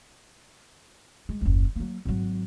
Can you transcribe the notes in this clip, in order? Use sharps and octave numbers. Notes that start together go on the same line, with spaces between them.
G#3
F#1 D#2
F#3 A#3
G#1 F#3